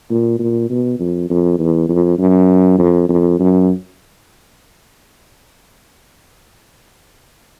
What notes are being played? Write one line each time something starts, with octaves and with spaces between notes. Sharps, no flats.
A#2
A#2
B2
F2
F2
E2
F2
F#2
F2
F2
F#2